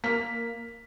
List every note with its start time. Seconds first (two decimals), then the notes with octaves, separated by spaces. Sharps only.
0.04 A#3 F6 B6